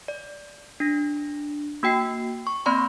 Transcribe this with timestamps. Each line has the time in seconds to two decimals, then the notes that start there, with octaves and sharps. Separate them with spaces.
0.08 D5
0.80 D4 A#6
1.83 A#3 F#4 G5 C7
2.47 C#6
2.66 A#3 C4 D5 B5 C6